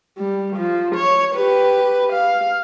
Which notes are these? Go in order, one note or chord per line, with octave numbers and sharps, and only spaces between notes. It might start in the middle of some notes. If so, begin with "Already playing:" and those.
G3
F3
C#5
G4 B4
F5